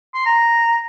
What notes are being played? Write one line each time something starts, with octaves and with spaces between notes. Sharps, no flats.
C6
A#5